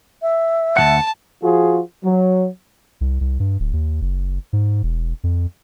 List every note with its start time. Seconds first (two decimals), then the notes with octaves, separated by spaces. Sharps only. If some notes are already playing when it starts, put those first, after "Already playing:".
0.22 E5
0.77 D2 D#3 F#5 A5
1.43 F3 F4 F#4 G#4
2.05 F#3
3.01 C2
3.21 C2
3.40 G2
3.60 D1
3.73 D#2
4.02 F#1
4.53 G#2
4.83 E1
5.24 F2